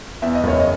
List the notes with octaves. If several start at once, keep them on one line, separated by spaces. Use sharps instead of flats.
E2 E5
D#5
F#1 C#5
D#5